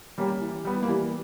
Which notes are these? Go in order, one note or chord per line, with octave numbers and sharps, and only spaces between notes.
G3 A#3 C#4 G4
E3
G3 B3
A#3
E3 G3